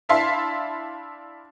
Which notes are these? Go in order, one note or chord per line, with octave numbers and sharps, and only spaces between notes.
D4 E4 E5 F5 A5 C6